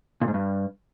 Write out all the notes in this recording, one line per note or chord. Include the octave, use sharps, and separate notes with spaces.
A#2
G#2
G2